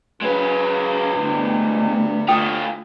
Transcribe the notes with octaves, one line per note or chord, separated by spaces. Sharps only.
C#3 F#3 G#3 B4
D2 G2 C3 G3 B3
A3 F4 G5 D#6